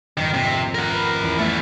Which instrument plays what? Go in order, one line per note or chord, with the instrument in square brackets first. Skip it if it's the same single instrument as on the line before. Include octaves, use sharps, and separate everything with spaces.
[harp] G#1 F2 [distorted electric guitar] D#3
[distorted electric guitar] C3
A#4 F#5
[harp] B4
E2
[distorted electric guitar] A3 B3